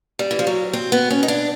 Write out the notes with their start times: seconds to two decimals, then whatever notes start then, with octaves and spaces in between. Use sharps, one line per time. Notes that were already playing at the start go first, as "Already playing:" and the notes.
0.19 G3
0.31 E3
0.39 F3
0.47 F#3
0.73 C4
0.92 B3
1.11 C#4
1.23 D#4
1.28 D4